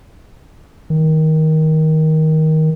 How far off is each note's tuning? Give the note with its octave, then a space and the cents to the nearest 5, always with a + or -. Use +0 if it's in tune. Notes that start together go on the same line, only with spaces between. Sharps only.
D#3 +15